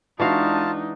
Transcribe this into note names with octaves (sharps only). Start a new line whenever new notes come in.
E3 G#3 D4 D#4 F4 F#4 F5 A5